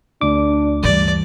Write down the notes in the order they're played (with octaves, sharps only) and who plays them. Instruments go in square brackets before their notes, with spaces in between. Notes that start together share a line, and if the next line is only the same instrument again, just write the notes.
[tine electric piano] D2 D6 [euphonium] D4
[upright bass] G2 E3 [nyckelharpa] D5